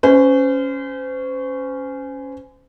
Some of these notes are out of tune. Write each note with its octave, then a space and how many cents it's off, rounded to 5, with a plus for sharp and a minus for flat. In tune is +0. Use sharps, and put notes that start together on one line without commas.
C#4 +0 C5 -35